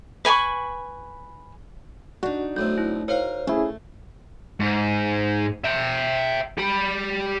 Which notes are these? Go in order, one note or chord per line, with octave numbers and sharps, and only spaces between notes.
B4 G#5 B5 C#6
D4 D#4 F#4
B1 A2 C4 G6
E4
D#4 A#4 C5 C#5 F5
A3 C#4 E4 G#4
G#2
E5 G5
G4 B5